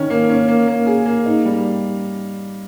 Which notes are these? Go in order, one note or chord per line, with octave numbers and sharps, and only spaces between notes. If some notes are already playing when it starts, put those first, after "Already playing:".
Already playing: D#3 C#4
A#3
C#4
A#3
A#3
G#4
A#3
D#4
G3